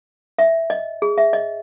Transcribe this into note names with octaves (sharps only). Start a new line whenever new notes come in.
E5
D#5
G#4
E5
D#5